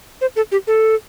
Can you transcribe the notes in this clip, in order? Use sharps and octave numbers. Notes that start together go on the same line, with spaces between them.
C5
A4
G4
A4